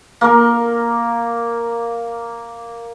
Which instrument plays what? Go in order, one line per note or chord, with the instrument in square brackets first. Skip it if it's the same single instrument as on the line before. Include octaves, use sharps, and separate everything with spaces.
[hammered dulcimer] A#3 A#4